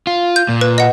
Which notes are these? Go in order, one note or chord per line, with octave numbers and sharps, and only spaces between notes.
F4
G6
A#2
B4
D#5 F#5